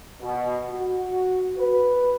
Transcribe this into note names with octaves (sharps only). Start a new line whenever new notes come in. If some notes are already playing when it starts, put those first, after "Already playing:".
B2
F#4
B4